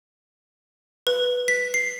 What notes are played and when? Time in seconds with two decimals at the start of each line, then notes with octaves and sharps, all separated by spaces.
1.07 B4
1.48 B6
1.74 C7